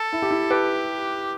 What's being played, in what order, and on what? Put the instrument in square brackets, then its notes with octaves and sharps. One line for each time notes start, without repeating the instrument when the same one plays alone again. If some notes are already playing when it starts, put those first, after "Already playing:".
Already playing: [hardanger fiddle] A4
[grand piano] E4
G4
E4
[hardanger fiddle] G4 [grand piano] B4